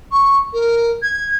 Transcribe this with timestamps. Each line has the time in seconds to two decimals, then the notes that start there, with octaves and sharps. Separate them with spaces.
0.12 C#6
0.53 A#4
1.03 G#6